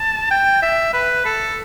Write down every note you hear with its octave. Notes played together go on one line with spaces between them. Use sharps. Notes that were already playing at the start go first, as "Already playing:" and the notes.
Already playing: A5
G5
E5
B4
A4